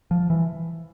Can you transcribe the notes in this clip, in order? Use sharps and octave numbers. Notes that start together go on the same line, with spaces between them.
F3
E3